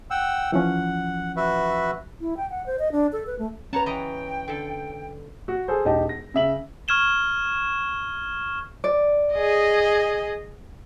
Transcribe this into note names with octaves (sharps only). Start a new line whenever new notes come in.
F#5 G5 E6
E3 F3 C#4 F#5
F#4 B4 E5
E4
G5
F#5
C5
D#5
D4
A4
B4
A3
C#4 B4 C#5 F#5 A5 A#5
E3 D#5 G5 A#5
D3 A4
F#4
G#4 A4 C5
E1 D#4 G4 D#5 A5
A#6
C#3 E5 F#7
C#6 F6 G#6 E7 G7
D5
G#4 D#5